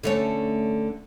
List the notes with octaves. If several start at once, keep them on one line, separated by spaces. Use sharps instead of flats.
D3 A3 C#4